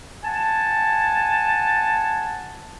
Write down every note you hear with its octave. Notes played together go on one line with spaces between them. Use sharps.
F#5 G#5 A5